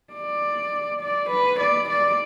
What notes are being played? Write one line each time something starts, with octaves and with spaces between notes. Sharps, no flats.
D5
D5
B4
D5
D5